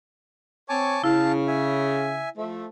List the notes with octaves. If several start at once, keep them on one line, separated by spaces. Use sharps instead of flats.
C4 C#5 G#5 A5 D6
C#3 E4 F5 A5
E5 G#5
F3 A3